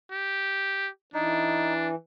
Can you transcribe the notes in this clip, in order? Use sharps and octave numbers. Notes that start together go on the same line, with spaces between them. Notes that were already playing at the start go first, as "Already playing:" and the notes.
G4
E3 D4 D#4